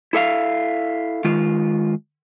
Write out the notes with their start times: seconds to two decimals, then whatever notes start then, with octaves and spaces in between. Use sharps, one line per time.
0.13 E4 A4 E5 F5
1.25 D#3 G#3 F4